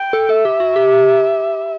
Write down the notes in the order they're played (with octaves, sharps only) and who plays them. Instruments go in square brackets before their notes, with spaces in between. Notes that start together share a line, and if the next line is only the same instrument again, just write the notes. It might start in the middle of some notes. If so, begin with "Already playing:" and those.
Already playing: [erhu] G5
[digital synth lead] A4
[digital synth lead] A4 [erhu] E5
[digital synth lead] G4
F#4
G4